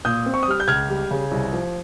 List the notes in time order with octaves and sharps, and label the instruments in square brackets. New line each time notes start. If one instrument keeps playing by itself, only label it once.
[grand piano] A#2 D#6 G6
C4
C#6
D#6
G3 F6
G6
C#2 F6 G#6
G3
C#3
C2
F3